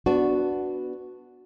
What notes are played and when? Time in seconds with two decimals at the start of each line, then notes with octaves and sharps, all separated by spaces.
0.06 B3 D4 F#4